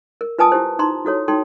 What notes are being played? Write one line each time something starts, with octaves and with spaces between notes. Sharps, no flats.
A#4
F4 B4 G#5 A5 D#6 E6
E4 G4 C5
D#4 A#5 C6
E4 F#4 A4 C#5
D#4 A4 G5 C6